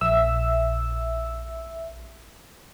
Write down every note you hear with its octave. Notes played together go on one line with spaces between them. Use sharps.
A#1 E5 E6